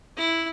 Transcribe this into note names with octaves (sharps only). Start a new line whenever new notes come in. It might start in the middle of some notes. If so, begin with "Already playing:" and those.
E4